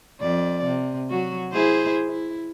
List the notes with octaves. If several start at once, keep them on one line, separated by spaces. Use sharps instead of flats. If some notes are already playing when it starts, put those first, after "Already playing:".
F2 D5
C3
F#3 F#4
E4 G#4 C5
E4